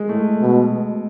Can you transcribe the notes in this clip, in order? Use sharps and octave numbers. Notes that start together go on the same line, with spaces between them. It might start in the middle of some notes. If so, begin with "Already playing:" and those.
Already playing: G#3
A2 A3
B2